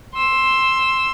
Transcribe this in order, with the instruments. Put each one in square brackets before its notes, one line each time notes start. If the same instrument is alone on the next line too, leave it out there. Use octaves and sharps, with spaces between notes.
[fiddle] C6 E6